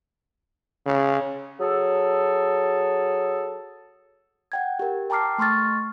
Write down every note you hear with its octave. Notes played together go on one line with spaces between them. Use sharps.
C#3
F#3 G#4 A4
F#5 G5 G#6
G4 A#4
G5 A5 A#5 D6 F6 C7
A3 C6 C#6 F6 A6